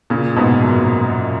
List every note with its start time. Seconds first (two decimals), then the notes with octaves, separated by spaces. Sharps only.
0.10 A#2 C#3
0.36 G#2 B2
0.62 F#2 A#2